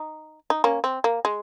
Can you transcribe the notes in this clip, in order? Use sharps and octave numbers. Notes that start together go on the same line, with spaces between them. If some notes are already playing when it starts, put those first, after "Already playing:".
Already playing: D#4
D#4
A#3 C#4
C4
A#3
G#3